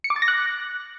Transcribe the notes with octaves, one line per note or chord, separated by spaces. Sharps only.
C#7
D6
A6
A#6
F#6